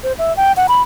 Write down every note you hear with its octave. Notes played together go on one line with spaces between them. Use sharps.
C5
E5
G5
F#5
B5